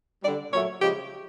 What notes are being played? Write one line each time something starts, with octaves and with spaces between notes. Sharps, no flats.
D3 G3 D5
A#2 F#3 A3 C#5
C#3 F3 G#3 G4